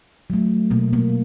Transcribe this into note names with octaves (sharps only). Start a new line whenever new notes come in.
F#3 A3
B2 A#3
A#3